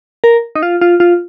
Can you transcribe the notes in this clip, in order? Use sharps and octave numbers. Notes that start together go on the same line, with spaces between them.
A#4
D#4
F4
F4
F4